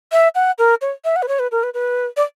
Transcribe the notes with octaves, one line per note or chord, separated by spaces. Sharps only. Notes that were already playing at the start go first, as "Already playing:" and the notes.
E5
F#5
A#4
C#5
E5
F#5
B4
C#5
B4
A#4
B4
B4
D5